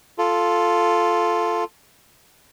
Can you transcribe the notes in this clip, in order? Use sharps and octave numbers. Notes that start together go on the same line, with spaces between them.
F4 A4